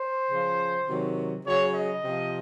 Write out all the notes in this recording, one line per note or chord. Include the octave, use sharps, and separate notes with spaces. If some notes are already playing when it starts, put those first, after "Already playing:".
Already playing: C5
C#3 F3
C3 D#3 F#3
C#3 F#3 C#5
D#5
C3 F3